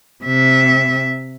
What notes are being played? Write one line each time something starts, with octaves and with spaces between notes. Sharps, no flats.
C3 E5